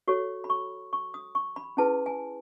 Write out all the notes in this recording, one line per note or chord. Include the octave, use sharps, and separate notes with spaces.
F#4 A4 C#5 C#6
B5
C#6
C#6
D#6
C#6
B5
C#4 E4 G#4 B4 A5
G#5